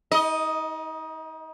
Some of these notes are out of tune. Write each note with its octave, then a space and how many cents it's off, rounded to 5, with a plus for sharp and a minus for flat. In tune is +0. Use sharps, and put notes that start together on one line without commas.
D#4 +40 D#5 +5